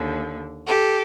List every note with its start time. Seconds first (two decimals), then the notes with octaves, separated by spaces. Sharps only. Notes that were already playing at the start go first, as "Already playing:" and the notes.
Already playing: D#2 D3
0.67 G4 A4